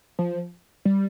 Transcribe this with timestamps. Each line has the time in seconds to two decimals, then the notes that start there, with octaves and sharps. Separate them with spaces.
0.19 F3
0.85 G3